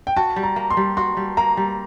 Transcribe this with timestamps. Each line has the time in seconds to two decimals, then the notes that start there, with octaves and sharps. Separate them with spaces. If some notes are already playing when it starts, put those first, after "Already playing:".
0.07 G5
0.16 F#4 A5
0.36 G3
0.43 A#5
0.56 A#3
0.70 C6
0.77 G3
0.97 F#4 C6
1.17 G3
1.37 A#3 A#5
1.57 G3